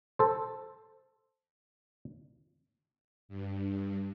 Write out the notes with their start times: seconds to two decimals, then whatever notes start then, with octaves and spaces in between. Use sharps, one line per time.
0.19 A4 C5
3.29 G2